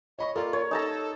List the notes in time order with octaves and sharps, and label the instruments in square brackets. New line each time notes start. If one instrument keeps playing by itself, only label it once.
[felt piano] C#5 B5 C#6 [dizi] D#5
[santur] A#3 [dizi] F4 [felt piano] A4 D5
[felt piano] A#4 [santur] C#5
[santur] D#4 A5 A#5 [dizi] A4